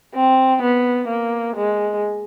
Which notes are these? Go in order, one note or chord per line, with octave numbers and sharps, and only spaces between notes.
C4
B3
A#3
G#3